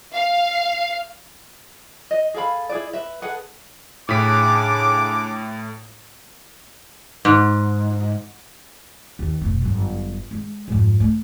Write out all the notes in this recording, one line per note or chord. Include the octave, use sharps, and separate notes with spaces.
F5
D#5
G#4 A4 F5 B5
E4 G#4 B4 D5
B4 E5
G#4 A4 B4 F#5
A2 C#3 D4 D6 B6 D7
G#2
D#2
F1 B2
G1 F#2
G#3
F2 G#2
A3